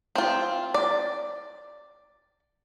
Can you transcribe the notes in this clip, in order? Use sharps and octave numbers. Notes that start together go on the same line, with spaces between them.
C4 F4
D5